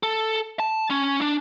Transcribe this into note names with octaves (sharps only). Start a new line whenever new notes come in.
A4
A5
C#4
D4